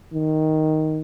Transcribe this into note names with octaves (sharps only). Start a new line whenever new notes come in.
D#3